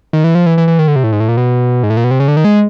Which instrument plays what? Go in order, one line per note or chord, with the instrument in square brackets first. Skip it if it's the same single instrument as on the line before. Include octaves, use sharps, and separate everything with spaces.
[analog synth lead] D#3
E3
F3
E3
E3
E3
D#3
D3
C3
A2
G#2
A2
A#2
B2
G#2
A2
A#2
B2
C3
C#3
D3
D#3
G#3